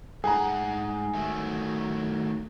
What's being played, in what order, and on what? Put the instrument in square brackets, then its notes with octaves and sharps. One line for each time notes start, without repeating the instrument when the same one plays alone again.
[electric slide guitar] G#2 F#5 [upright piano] G#4 A#5
[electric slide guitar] D#3 F#3 A3